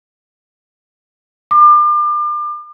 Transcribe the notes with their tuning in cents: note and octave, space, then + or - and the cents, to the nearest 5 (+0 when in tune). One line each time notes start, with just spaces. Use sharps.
D6 +35